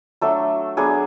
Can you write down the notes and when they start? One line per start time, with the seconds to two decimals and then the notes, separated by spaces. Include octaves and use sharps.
0.21 F#3 A3 D4 A4
0.77 F#3 B3 D4 G#4